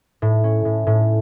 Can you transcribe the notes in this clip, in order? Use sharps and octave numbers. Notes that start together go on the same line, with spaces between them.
A2
C#4
A2
A2